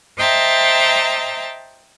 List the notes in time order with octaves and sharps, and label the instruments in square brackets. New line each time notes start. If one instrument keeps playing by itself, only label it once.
[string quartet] C5 D#5 E5 G5 A5 A#5